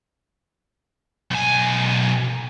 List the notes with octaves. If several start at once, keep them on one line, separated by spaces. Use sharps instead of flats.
B1 G#5